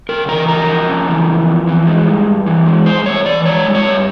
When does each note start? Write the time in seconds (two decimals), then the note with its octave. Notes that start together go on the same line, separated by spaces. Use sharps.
0.09 C#3 A#4
0.28 E3 A#4
0.48 F2 A#4
0.68 F2
0.88 C#3
1.07 E3
1.27 F2
1.47 F2
1.67 E3
1.87 G#3
2.07 G2
2.27 G2
2.46 E3
2.66 G#3
2.86 G2 C5
3.06 G2 C#5
3.25 E3 D5
3.45 G#3 C#5
3.65 G2
3.75 C#5
3.85 G2